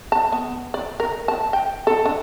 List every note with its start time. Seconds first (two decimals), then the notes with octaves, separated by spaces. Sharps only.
0.12 A5
0.32 B3
0.74 D5
1.00 A#4
1.28 A5
1.53 G5
1.87 A4
2.06 D4